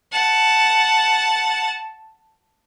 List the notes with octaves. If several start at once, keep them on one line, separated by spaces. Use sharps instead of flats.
F#5 A5